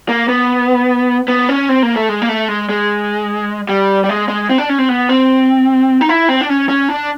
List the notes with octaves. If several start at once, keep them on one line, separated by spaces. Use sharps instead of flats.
A#3
B3
B3
C#4
C4
A#3
A3
G#3
A#3
A3
G#3
G#3
G3
G3
G#3
G#3
C4
D4
C#4
C4
B3
C4
D#4
E4
C4
D4
C#4
C#4
D4